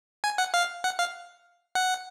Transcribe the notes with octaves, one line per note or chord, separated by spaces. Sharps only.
G#5
F#5
F5
F#5
F5
F#5